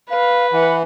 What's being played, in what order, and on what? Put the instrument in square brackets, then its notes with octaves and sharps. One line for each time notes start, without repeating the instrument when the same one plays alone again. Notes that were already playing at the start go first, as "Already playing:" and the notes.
[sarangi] B4 [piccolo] F5
[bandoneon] E3 [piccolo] F#5